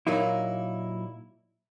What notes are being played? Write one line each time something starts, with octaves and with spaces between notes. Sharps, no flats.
A#2 F#3 A#3 D#4 E4